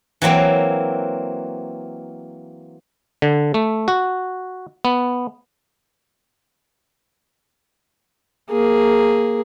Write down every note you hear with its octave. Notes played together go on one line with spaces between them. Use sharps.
E3 F#3 A#3 C4
D3
A3
F#4
B3
A#3 G#4